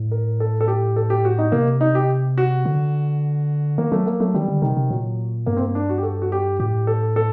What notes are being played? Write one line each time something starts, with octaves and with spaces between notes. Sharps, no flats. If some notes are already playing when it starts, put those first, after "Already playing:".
Already playing: A2
A#4
A4
A4
G4
A4
G4
F#4
D#4
C3 A#3
D#4
G4
F#4
D3
D#3 A#3
F#3 A3
A#3
F#3 A3
D#3 G3
D3
C3 D#3
C3
A#2 F#3
G2 A#3
C4
A#3
D4
F#4
G4
A4
F#4
G4
A2 G4
A4
A4